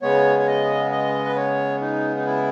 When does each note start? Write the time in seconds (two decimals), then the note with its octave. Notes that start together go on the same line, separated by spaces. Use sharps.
0.02 C#3 G#3 B3 C#5
0.39 C#5
0.47 D#5
0.92 D#5
1.26 B4
1.36 C#5
1.81 D#4
2.17 D#4
2.26 E4